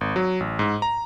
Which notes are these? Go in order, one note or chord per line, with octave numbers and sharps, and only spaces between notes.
G#1
F#3
A1
G#2
A#5